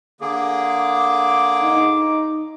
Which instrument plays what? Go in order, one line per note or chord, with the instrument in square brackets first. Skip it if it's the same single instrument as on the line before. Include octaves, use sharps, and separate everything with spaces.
[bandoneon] D3 A#3 G#4 [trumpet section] D6
[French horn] D#4